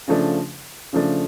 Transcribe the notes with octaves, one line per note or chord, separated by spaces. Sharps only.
C#3 F3 A3 D4
C#3 F3 A3 D4